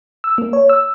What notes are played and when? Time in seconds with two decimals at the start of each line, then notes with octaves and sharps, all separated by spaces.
0.24 E6
0.38 A#3
0.53 C#5
0.69 E6